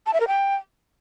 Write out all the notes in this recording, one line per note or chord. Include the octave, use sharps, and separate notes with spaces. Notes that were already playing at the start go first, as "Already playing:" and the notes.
A5
E5
A#4
G5